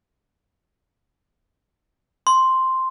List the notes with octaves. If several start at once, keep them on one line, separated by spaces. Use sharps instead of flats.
C6